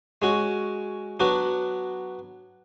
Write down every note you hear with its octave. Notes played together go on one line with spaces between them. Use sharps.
G#3 C#4 F#4
F#3 B3 D4 F#4